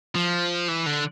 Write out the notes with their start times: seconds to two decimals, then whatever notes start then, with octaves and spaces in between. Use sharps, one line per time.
0.15 F3
0.68 E3
0.86 D3